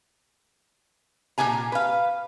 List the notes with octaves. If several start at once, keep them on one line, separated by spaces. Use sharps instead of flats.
A#2 C#4 G4 G#5 A#5
B4 F5